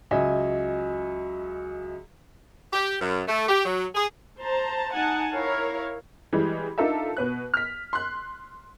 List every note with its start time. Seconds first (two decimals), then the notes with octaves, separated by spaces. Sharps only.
0.11 C#2 F#3 D#5 E5 G#5
2.72 G4
3.01 F#2
3.28 A3
3.48 G4
3.65 F#3
3.95 G#4
4.40 C5 A5 A#5
4.94 D#4 F#5 G#5 A5
5.33 E4 A#4 C#5 F5
6.33 E3 G3 G#3
6.78 D4 D#4 F4 A4 A#4 E5
7.17 B2 B4 F#6
7.54 F6 B6
7.93 C6 F#6